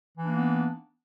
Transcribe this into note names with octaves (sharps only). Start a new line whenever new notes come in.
E3 A#3 B3 D4 D#4